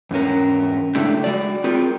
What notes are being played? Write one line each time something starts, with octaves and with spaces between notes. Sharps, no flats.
E2 G#2 C#4 A#4
C#3 G#3 A3 D4 E4 G4
G#3 F#4 D5
C4 D#4 F4 G4 G#4 A#4